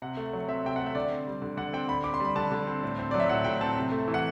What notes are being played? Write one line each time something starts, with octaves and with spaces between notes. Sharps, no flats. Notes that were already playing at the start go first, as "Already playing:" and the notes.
C3 F#5
A3
F#3
C4 E5
C3 G5
A3 F#5
E5
D3 D5
C4
G3
D3
D3 F#5
C4 G5
D3 B5
C4 D6
C6
G3 B5
D3 A5
D3
C4
A2
C4
F#3 D5
E5
A2 F#5
A2 G5
C4 A5
C3
A3
E3
F#5